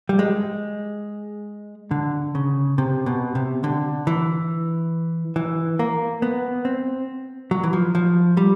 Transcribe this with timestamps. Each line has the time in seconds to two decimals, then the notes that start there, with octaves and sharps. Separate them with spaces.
0.09 G3
0.19 G#3
1.91 D3
2.35 C#3
2.78 C3
3.06 B2
3.35 C3
3.64 D3
4.07 E3
5.36 E3
5.79 A#3
6.22 B3
6.65 C4
7.51 F#3
7.64 E3
7.73 F3
7.95 F3
8.37 G3